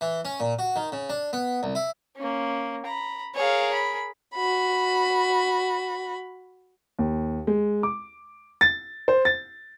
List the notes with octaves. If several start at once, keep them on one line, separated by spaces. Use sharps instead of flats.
E3
C#4
A#2
F#4
D#3
C#3
D4
B3
C2
E4
A#3 C#4
A#5 B5
G#4 A#4 C#5 F5
B5
F#4 B5
D#2
G#3
D6
A6
C5
A6